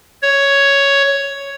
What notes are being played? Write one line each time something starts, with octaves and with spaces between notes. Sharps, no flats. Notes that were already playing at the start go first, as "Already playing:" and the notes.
C#5